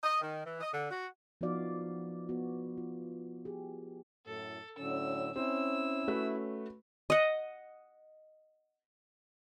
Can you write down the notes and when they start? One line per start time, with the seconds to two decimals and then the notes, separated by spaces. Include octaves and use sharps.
0.03 D#5
0.22 D#3
0.46 E3
0.61 D#5
0.73 D3
0.91 F#4
1.41 F3 B3 D#4 F#4 D5 F5
2.29 B3 F#4
2.77 F4
3.45 G4 G#4
4.26 F#2 A2 A4
4.78 A2 D3 F#3 C#4 E6
5.36 C4 C#4 E4 E6
6.08 A3 F#4 B4
7.10 D#5 F#5